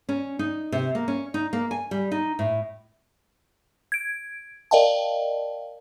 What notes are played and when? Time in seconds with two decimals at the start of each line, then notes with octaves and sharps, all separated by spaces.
0.09 C#4
0.39 D#4
0.72 C3
0.95 A#3
1.08 C#4
1.34 D#4
1.53 A#3
1.71 G#5
1.91 G3
2.11 D#4
2.39 A2
3.92 G#6 D7
4.71 A#4 D5 D#5 F5 G5 A5